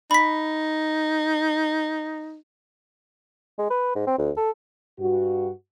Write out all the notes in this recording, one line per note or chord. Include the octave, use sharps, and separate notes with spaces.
D#4 B5 B6
G#3
B4
G#2
C4
D2
A4
G2 F#4